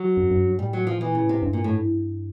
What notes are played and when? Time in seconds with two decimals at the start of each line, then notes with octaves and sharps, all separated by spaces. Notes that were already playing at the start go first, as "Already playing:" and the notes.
Already playing: F#3
0.17 F#2
0.31 F#2
0.45 G2
0.59 A2 G3
0.73 F#3
0.87 F3
1.00 A#2 E3
1.15 C#3
1.22 A2
1.29 C3
1.43 G2
1.53 A#2
1.64 A2